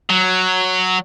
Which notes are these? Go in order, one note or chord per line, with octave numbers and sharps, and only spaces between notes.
F#3